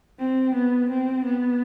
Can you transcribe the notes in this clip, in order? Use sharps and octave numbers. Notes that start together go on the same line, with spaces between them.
C4
B3
C4
B3